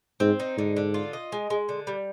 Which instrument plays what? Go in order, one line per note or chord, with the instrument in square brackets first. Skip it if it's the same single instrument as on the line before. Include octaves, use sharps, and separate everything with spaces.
[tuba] G#2 [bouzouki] C4
[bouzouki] D#4
[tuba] G#2 [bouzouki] D3
[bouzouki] D3
F4
D#5
G#3
G#3
D3
G3